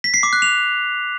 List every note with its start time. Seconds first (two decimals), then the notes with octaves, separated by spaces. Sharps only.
0.04 B6
0.14 C7
0.23 D6
0.33 F#6
0.42 F7